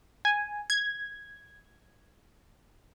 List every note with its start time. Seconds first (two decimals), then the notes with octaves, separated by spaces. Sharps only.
0.25 G#5
0.70 G#6